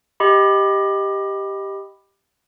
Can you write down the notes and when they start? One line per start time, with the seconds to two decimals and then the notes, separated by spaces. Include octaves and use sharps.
0.20 G4 D#5 B5